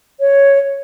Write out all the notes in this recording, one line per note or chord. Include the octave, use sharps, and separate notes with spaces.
C#5